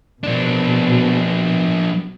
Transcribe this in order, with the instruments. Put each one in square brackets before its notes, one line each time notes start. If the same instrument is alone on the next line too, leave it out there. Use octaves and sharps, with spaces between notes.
[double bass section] B2 [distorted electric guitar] F3 D4